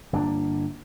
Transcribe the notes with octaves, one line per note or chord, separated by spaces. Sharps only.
G1 A#3 C#4 D4